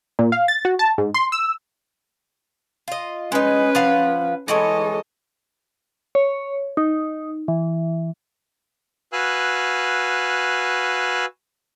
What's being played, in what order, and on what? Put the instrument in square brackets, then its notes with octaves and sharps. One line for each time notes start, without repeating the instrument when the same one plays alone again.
[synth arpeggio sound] A#2
F5
A6
F#4
A5
G#2
C6
E6
[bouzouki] F4 D#5
[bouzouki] G#3 D#4 [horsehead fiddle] C#4 B4
[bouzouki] F3 F5 F#5
[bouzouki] E3 G#3 C#5 [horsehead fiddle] A4 D#5
[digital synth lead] C#5
D#4
E3
[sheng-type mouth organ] F#4 B4 F5 G#5 E6 F#6